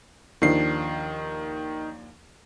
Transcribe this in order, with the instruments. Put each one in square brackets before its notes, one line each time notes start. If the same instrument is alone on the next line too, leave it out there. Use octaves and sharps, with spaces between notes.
[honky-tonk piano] D#2 F3 D4 [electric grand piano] D#3 C7